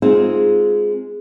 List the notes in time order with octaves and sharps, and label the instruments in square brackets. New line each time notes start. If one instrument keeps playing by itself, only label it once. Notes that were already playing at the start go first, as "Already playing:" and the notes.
[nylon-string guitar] G#3 C4 D#4 F4 G#4